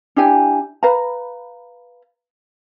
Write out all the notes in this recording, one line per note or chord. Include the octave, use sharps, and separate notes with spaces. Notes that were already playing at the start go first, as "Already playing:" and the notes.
D4 E4 G4 G#5
B4 F5 A#5